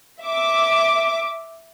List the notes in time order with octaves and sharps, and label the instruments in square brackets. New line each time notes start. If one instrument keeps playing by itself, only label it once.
[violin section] E5 D6